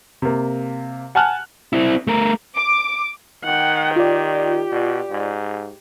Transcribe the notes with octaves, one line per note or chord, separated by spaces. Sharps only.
C3 A#3
F#5 G#5 A5 F6 F#6
C4 E4
A3 A#4
D6
D#3 F#5 G5
F4 G4 D5
B2
G#2